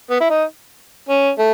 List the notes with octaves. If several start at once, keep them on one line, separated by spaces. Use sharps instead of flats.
B3
E4
D#4
C#4
A3